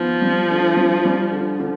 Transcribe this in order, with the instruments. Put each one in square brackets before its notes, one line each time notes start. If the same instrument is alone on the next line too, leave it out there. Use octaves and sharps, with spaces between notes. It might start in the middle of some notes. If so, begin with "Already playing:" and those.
Already playing: [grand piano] D#3 B3 [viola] F3
[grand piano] G3
D3
G3
G3
D3
D3